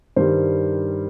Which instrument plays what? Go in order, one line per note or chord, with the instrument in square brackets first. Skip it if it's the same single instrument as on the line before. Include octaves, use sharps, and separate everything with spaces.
[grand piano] G2 D#3 G3 C5